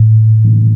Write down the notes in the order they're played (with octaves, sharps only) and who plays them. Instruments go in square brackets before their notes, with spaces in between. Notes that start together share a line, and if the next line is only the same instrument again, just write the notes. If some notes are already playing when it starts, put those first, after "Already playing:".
Already playing: [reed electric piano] A2